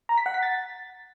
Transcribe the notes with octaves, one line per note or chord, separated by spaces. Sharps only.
A#5
B6
F#5
B6
A6